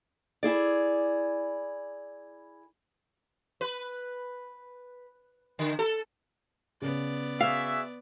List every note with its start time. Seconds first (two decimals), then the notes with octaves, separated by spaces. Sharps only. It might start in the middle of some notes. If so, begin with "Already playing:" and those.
0.43 E4 G#4 D5
3.61 B4
5.59 D3
5.79 A4
6.82 C#3 B3 D5
7.41 F#4 G#4 E5 F5